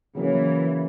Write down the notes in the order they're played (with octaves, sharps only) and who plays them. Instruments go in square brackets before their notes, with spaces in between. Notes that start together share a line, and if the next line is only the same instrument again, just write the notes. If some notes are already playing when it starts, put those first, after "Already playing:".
[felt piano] C#3 F#3 A#3 C#4 [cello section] E3